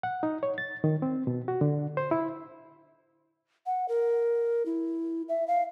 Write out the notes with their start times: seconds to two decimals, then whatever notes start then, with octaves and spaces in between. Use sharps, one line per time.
0.03 F#5
0.23 D#4
0.43 C#5
0.58 A6
0.84 D#3
1.02 C4
1.27 B2
1.48 F#4
1.61 D3
1.97 C5
2.11 E4
3.66 F#5
3.88 A#4
4.66 E4
5.29 E5
5.48 F5